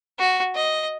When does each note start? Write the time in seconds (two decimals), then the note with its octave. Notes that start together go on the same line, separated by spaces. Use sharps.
0.19 F#4
0.55 D#5